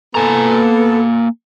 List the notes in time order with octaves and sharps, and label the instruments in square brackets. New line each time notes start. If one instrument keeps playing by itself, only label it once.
[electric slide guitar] A#3 G#5 A#5 [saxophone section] B3 A4